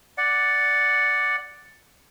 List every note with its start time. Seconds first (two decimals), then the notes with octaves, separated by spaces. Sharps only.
0.18 D5 F#5